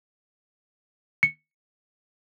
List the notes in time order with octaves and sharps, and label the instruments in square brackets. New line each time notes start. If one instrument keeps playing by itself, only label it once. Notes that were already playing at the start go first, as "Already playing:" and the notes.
[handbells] C#7